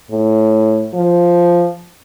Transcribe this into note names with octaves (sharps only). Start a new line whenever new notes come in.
A2
F3